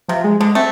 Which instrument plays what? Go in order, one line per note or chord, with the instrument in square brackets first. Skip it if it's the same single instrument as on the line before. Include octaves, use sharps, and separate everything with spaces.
[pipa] C3 [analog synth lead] F3
[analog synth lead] G#3
[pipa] D3 [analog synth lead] G#3
[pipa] A3 [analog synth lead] C4